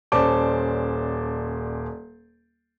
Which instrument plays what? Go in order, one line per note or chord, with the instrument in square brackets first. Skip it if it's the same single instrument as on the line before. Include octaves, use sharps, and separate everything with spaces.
[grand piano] D#1 C#4 C5 D5 A5 D6